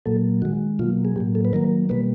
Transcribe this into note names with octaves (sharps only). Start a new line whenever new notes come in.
A#2 F#3 A#3 A4
D#3 G#3 F#4
B2 F#3 A#3 F4
G#4
A2 F#3 A#3 G4
A4
B4
D#3 F#3 A#3 A#4
B2 G3 A#3 B4